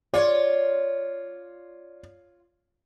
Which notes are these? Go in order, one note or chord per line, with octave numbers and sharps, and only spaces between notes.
F4 C#5 D5